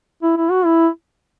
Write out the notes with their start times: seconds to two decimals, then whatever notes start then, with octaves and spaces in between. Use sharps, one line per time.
0.23 E4
0.37 E4
0.51 F#4
0.65 E4